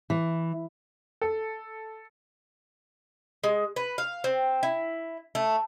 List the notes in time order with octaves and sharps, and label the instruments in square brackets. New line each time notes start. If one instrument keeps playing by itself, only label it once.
[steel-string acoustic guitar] E3
[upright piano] A4
[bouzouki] G#3
B4
F5
C4
E4
A3